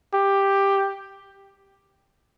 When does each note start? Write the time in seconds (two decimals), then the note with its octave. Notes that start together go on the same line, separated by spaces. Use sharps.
0.14 G4